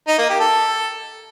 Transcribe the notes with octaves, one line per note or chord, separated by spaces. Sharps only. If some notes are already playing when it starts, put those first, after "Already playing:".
D#4
A#3
G4
A4